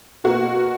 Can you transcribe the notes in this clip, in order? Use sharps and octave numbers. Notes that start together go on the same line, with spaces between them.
B2 A#3 F#4